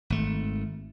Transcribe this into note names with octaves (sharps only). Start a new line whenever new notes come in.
G#1 A3